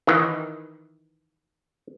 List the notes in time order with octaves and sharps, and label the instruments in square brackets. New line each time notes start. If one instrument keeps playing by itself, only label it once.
[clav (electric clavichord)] D#3 E3